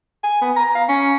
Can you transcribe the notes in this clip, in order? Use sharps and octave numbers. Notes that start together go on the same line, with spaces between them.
G#5
B3
A#5
F5
C#4